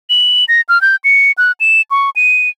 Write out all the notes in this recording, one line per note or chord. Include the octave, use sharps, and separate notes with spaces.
F#7
A#6
F6
G6
C#7
F#6
E7
C#6
D#7